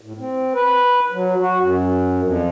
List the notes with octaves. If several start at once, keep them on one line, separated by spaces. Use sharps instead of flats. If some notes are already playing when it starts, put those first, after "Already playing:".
A2
C4
B4
F#3
F#4
F#2
F2